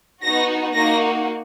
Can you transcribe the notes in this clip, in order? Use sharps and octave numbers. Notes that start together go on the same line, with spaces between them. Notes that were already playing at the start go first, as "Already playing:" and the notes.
B3 D#4 F#4 A#6
A#3 D#4 F#4 A#6